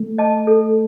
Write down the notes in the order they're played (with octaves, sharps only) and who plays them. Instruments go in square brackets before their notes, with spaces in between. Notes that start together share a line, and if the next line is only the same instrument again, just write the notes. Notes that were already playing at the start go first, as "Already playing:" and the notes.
Already playing: [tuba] A3
[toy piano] D#5 A5
A4